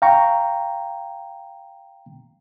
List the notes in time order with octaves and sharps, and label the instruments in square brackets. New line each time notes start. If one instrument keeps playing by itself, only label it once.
[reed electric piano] F5 G5 A#5 C#6